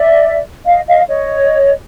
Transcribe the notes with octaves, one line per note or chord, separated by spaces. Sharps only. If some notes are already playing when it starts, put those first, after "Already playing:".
Already playing: D5 E5
D#5 F5
D#5 F5
C#5 D#5